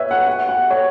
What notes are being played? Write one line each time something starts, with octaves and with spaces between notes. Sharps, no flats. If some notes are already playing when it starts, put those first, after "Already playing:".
Already playing: B4 C#5 E5
F#5
F#5
F#5
C#5